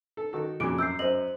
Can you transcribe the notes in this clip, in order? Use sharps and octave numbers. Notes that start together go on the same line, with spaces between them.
A4
D#3 F#4 A4
F2 A#2 C#3 F#4 D6 D7
F#2 E6 G6 C7
F#2 C5 D#5 F#7